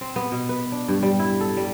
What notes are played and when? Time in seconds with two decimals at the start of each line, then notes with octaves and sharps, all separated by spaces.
0.01 C4
0.16 B3
0.32 B2
0.49 B4
0.72 D4
0.88 G2
1.03 G3
1.19 E4
1.41 A4
1.57 G3